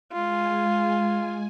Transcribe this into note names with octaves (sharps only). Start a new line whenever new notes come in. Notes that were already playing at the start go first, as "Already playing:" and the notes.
G#3 F4 G#5